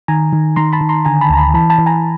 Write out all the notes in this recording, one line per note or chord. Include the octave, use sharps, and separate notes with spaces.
D#3 G#5 A#5
D#3
D#3 A#5 C6
A5 B5
D#3
A#5 C6
D3 G#5 A#5
A5 B5
D2 A#5
A5 B5
E3 A5 B5
A5 B5
E3
G#5 A#5